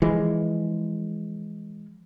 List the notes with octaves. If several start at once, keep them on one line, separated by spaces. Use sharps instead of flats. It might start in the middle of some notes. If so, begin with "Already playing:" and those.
E3 F3 G#3